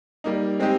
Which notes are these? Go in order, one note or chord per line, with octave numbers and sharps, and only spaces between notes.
G3 A#3 D#4
G#3 C4 D#4 G4